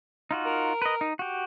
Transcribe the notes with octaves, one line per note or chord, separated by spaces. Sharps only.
D#4 F4 F#4
A#4
B4 D#5
D#4
F#4 G4